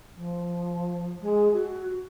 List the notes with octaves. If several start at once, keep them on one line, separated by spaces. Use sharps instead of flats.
F3
G#3
F#4